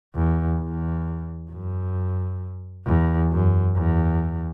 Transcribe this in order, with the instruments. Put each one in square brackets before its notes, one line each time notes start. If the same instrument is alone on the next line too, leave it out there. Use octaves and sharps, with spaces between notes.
[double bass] E2
E2
F#2
E2
F#2
E2